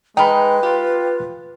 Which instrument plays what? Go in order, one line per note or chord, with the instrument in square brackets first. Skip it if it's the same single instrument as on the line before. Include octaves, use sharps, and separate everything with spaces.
[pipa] D#3 D#4 [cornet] G#3 [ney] B4 [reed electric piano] G5 B5
[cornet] F4 [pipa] G4